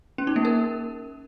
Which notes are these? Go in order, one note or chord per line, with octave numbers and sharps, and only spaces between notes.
C#4
D#4
A#3
A#4